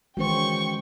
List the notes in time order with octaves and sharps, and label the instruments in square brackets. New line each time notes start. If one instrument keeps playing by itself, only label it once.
[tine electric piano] D#3 E3 F#4 [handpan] G#3 C#4 C5 [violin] G5 C#6